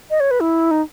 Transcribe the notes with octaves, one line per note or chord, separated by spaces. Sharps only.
D#5
C#5
B4
E4
D#4